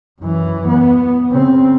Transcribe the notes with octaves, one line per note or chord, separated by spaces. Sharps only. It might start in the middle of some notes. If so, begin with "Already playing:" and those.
F#2 E3
B3
C#3 C4